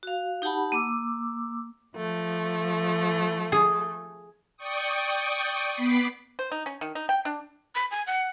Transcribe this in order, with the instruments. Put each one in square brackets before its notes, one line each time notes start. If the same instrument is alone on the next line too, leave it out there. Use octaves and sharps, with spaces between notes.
[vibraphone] F#4 F5
D#4 G4 F#5 A5 B5
A#3 D6 E6
[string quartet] F3 A3
[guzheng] G#4
[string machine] D5 G5 C#6 D#6
B3 B5 D6 B6 C7
[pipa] C5
D#4
C#4
D#3
D#4
G5
D4
[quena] B5
G#5
F#5